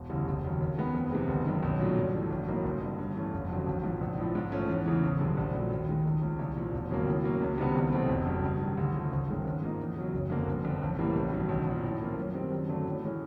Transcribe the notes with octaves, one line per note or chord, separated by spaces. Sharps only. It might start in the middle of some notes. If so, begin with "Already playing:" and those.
Already playing: E1
D2 C#3 E3 G3
F1
D#2 C#3 F#3
D#2
D#3 G#3 B3
F2
C3 D#3 G#3 B3
G1
F#2 D#3
B1
A#2 F#3 A3 D4
G2
E3 A3 D4
A1
A2 F#3 A#3 D#4
G1
G2 D3
G2
E3 A3 C#4
F1
F2 D3 F#3
A1
G#2 F3
A#1
A2 F3
G#2
F3 A3 C#4
E2
C#3 E3
G#1
F#2 D3 G3
A#1
A#2 F#3 A3
D#2
D#3 G#3
C#2
C#3 F3
C2
A#2 F3
E1
D#2 C#3 F#3 A#3
A2
F#3 A#3 C#4
C#2
C3 D#3 G3 B3
C2
B2 F#3 A3 C4
F1
F2 C#3 F#3
G2
D#3 G3
D2
C#3 F3 A3
G#1
G2 D#3 G#3 C#4
G#2
F3 A#3 D#4
E2
C#3 F#3
F#1
F2 D3 F#3 A#3
G1
F2 D3
A1
A2 E3 G3 A#3
A1
G2 D#3 F#3
B1
A#2 F3
A2
F3 A#3 C#4
F#2
D#3 G3 C4
F#2
D3 F#3 A3 D4
A2
E3 G#3 C#4